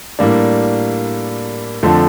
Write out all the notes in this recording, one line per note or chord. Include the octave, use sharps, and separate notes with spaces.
A2 G3 A#3 D4
F2 D3 F3 A3